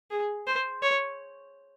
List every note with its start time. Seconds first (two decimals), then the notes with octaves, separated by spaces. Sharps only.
0.11 G#4
0.47 C5
0.82 C#5